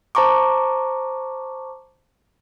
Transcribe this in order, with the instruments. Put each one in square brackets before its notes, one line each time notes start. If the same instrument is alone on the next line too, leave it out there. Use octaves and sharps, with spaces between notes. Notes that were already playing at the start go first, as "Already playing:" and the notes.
[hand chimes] C5 A5 A#5 C#6 D6